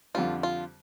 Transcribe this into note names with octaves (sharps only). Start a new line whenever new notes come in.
F2 D3 G3 C4 F4
F4